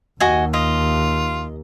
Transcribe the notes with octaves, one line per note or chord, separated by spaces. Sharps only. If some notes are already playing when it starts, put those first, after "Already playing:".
D#2 F#4 D#5 G#5
F4 D#5